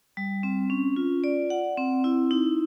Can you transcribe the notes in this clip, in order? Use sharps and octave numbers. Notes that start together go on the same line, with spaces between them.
G3
C4
C#4
F4
D5
F#5
C4
E4
D#4